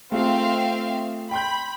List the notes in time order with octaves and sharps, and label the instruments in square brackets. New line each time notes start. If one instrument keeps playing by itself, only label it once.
[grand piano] A3 F4 G#4 [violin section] C4 E5 F5
[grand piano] G5 C6 G6 [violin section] B5